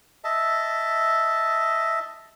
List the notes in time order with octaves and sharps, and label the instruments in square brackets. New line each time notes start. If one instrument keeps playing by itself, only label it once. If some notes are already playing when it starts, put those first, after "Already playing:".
[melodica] D#5 E5 A5